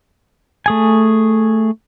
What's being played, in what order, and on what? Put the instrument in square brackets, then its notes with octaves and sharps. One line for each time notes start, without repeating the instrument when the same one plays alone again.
[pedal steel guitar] A3 G#4 G#5